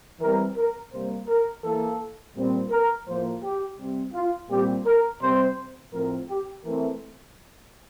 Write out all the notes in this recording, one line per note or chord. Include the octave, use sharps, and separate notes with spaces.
E3 G3 C4 A#4
A#4
C3 G3 A#3 C5
A#4
E3 A#3 A4
A#2 G3 C4
A#4
A2 F3 A#3 C5
G4
C3 G3 C4
F4
A#2 G3 C4 G4
A#4
C3 G3 C4 C5
A2 F3 C4 A#4
G4
E3 A3 C4 A#4